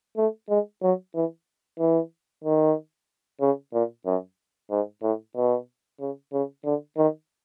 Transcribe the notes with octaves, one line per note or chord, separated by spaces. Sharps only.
A3
G#3
F#3
E3
E3
D#3
C#3
A#2
F#2
G#2
A2
B2
C#3
C#3
D3
D#3